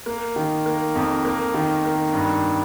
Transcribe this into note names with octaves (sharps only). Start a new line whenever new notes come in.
A#3
D#3
A#3
F2
A#3
D#3
A#3
G2